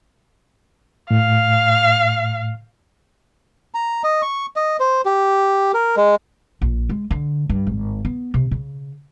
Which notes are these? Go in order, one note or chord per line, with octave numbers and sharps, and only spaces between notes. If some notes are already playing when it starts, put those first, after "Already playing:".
A2 F5
A#5
D#5
C#6
D#5
C5
G4
A#4
G#3
A#1
G#3
D3
G2
G#1
B3
C3
C#3